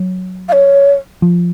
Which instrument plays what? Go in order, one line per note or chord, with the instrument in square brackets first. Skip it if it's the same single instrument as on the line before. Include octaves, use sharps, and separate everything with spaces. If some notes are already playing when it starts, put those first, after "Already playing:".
Already playing: [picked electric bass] F#3
[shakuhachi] F5
C#5
[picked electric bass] F3